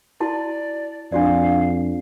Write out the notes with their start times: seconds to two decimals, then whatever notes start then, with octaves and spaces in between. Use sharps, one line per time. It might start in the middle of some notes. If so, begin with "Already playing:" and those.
0.20 E4 F#4 D5 A5
1.12 F2 D4 F#4 D5 F5